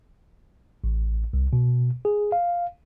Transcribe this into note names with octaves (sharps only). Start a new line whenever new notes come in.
A1
C2
B2
G#4
F5